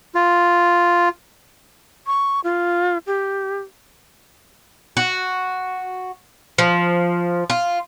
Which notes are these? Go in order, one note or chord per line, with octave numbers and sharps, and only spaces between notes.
F4
C#6
F4
G4
F#4
F3
F4